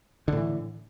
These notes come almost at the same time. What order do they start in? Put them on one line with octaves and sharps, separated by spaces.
D3 A2 E3